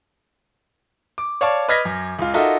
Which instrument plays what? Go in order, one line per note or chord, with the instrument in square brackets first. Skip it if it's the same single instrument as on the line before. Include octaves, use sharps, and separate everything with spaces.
[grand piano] D6
C#5 D5 F5 A5 C#6 D6
B4 D#5 F6 G#6 A#6 B6
F#2
C#2 F4
D#4 F4 F#4 A4 A#4 E5